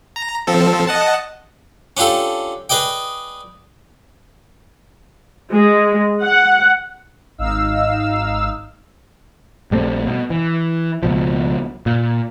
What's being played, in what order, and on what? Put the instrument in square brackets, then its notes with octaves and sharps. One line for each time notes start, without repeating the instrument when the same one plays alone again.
[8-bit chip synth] A#5
F3 C4 A4
D#5 F#5 A5
[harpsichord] C#4 D4 F4 G4 A4
G#4 B4 D5 D#5 G5
[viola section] G#3
F#5
[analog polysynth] G#1 D#4 F5 E6
[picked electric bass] A#1 G3 A3 C4
B2
E3
C#2 B2 F3
A#2